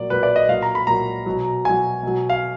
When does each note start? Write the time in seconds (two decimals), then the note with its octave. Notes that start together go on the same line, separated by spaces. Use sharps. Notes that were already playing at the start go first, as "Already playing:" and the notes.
Already playing: A#2 F#3 D5
0.10 A#2 F#3 B4
0.23 D5
0.36 D#5
0.49 A#2 F#3 F5
0.63 A#5
0.75 B5
0.87 A#2 F#3 A#5
1.26 B2 F#3
1.65 B2 F#3 G#5
2.03 B2 F#3
2.29 F5